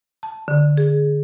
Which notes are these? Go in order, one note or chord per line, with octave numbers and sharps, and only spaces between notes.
A5
D3
G#4